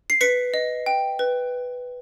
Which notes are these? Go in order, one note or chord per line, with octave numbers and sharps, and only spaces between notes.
C7
B4 B6 C#7
D#5
G5
B4